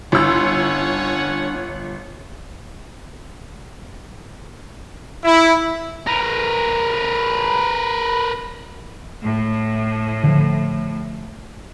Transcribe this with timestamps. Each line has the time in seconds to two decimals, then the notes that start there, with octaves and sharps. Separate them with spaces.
0.12 G1 C#4 D4 E4 C#5 F#5 C6 E6
5.24 E4
6.07 A#4 B4
9.24 A2
10.24 D3 F3